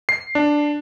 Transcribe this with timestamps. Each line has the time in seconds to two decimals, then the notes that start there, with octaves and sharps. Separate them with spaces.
0.09 C7
0.35 D4